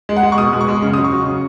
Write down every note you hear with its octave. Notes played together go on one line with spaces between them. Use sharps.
G#3
F#5
G#3
C#6
B2 D#6
G#3
C#6
G#3
C#3 C#6
F#3 D#6
C#6
F#3
C#3